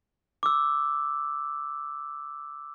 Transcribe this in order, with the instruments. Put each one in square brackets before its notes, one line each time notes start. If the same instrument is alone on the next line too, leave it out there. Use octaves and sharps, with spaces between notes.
[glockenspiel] D6 E6